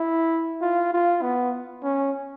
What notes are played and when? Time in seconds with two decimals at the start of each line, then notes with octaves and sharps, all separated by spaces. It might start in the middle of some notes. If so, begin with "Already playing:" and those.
Already playing: E4
0.62 F4
0.93 F4
1.22 B3
1.84 C#4